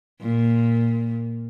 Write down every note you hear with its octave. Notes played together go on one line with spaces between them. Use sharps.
A#2